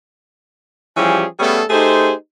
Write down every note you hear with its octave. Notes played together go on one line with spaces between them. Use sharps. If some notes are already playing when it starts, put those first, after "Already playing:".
E3 F3 G3 C#4 G4 G#4
G3 A3 B3 C#4 G#4 A4
A3 D#4 G4 G#4 C5